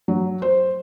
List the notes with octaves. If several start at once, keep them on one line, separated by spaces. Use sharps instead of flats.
F#3
C5